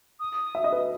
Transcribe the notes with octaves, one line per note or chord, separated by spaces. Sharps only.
D#6
E5
D#5
B4
D#5